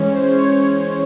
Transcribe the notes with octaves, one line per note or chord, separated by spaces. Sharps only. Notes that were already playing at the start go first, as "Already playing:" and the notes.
Already playing: E3 G#3 C#4 C#5
C5
C#5